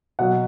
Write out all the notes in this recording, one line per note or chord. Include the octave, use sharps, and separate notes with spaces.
B2 F#3 F#5